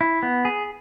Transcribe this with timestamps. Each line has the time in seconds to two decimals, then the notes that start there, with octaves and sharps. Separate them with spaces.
0.01 E4
0.23 B3
0.45 G#4